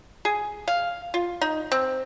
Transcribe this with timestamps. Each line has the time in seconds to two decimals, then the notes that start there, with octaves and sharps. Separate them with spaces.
0.25 G#4
0.68 F5
1.14 F4
1.41 D#4
1.72 C4